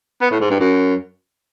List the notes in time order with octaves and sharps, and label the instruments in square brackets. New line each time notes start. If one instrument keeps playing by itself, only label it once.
[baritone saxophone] B3
A2
G#2
G2
F#2